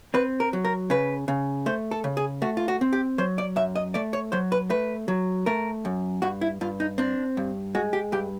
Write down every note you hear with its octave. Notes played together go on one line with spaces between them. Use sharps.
C4 B4
A#4
F#3
A#4
C#3 B4
C#3
A3 C5
A4
C#3
G#4
A3 F#4
F4
F#4
C4
G4
F#3 C5
D5
F#2 E5
D#5
A3 D5
C#5
F#3 C5
B4
A3 B4
F#3
A3 A#4
F#2
G2 F#4
E4
G2 F4
D#4
C4 D4
G2
G#3 F#4
G4
G2 G4